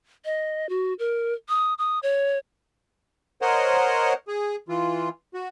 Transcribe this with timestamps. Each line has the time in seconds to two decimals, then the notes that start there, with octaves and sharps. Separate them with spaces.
0.25 D#5
0.69 F#4
0.99 A#4
1.49 D#6
1.78 D#6
2.03 C#5
3.42 A#4 C5 C#5 D#5 F#5
4.28 G#4
4.69 E3 F4
5.34 F#4